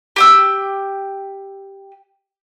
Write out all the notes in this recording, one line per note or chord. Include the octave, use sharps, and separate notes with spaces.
G4 G5 E6